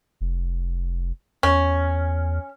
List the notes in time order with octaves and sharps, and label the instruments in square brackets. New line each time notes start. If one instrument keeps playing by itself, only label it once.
[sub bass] F1
[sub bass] E2 [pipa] C#4